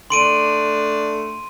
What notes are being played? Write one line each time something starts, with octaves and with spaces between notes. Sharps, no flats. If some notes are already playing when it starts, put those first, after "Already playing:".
A3 D4 C6 D7 D#7